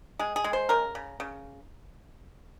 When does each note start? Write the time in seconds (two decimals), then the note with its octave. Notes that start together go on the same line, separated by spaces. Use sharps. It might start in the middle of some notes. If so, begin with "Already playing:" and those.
0.19 G#3 G#4
0.36 G#4
0.44 G#3
0.53 C5
0.69 C#3 A#4
0.95 C#3
1.20 C#3